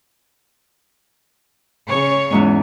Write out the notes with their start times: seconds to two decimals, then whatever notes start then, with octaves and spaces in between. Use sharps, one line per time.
1.88 C#3 C#5
2.31 E2 G#2 C#4